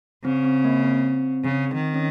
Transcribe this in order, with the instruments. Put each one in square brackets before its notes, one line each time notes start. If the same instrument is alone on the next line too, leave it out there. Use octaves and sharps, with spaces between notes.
[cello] C#3 [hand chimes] C4
[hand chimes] C4
A#3
C4
[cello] C#3
D#3
[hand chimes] C#4